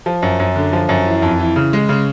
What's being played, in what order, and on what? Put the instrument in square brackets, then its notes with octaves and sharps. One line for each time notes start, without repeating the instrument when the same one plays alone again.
[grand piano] F3
F#2
F#2
D3
F3
F#2
E3
F2
E3
C#3
G#3
C#3